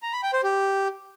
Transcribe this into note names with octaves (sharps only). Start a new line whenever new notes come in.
A#5
B5
G5
C5
G4